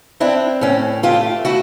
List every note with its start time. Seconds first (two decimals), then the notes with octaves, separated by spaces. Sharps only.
0.20 C4 D4 E4
0.61 A2 C#4
1.03 A3 F4 G4
1.45 A3 E4 F#4